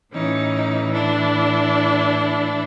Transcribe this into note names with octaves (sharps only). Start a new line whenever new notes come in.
A2 E3 C#4 D#4
D4 E4